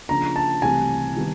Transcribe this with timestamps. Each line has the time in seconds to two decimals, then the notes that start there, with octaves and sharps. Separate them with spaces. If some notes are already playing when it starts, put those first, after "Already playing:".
0.09 C#3 F3 A#3 D4 F4 A#5
0.36 A5
0.62 C2 C3 E3 A3 G#5
1.16 D#3 G3 B3